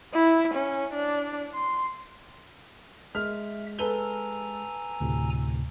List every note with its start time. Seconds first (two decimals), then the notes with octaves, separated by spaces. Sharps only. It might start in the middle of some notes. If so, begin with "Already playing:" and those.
0.14 E4
0.55 C#4
0.94 D4
1.54 C6
3.15 G#3 E5 F6
3.79 A4 B4 G#5 A#5 E6 G7
5.01 D2 A2 C3